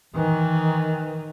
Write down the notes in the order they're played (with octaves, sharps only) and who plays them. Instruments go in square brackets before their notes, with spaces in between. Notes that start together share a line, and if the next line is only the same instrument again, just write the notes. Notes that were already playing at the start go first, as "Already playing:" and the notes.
[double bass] D#3 [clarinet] E3